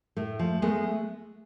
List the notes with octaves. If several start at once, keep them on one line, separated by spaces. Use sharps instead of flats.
A2 A3
F3
G#3 A3 B3